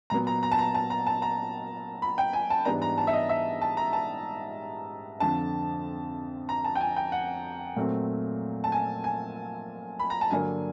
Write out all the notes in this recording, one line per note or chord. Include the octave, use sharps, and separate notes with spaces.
A#2 F#3 B3 A#5
A#5
A#5
A5
A#5
A5
A#5
A5
A#5
B5
G5
G#5
A5
G#2 E3 G3 B3 D4 A#5
A#5
A5
E5
D#5
E5
A5
A#5
A5
F2 D3 F3 A5
A#5
A5
G5
G#5
G5
F#5
A#2 F#3 A3 C4
A5
G#5
G#5
B5
A#5
A5
G2 D3 F#3 A#3 D4 G#5